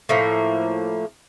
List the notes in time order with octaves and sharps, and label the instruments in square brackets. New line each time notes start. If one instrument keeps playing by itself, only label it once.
[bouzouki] A2 F3 A#3